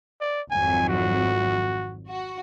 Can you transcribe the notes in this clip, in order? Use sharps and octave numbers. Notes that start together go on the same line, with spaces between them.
D5
G#1 F2 F#3 G#5
F#4
F#4